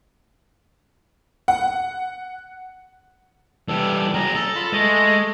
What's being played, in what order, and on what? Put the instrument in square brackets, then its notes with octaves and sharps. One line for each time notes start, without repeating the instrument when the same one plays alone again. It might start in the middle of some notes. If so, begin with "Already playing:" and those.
[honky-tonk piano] F#5
[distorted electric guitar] E3 G3 [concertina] A4
[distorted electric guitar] F#3 G#4 [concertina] A#5
[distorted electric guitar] A4
[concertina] F4 B5
[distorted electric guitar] G#3 [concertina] A3 D#5